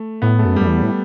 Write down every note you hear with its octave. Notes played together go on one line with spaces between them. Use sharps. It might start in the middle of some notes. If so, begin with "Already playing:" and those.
Already playing: A3
A2 B3
A3
F#2
F#2 G3
E2
A2